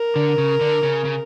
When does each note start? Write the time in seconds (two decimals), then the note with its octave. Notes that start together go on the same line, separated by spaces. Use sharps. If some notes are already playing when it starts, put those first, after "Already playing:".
Already playing: A#4
0.16 D3
0.38 C#3
0.61 D3
0.83 C#3
1.05 C#3